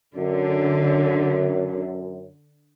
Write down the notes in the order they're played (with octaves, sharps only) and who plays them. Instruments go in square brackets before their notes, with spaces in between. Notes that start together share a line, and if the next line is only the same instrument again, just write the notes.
[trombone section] F#2 [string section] D3